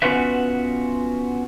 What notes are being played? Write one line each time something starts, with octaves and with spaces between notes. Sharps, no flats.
B3 C#4 F4 F#4 B4 E5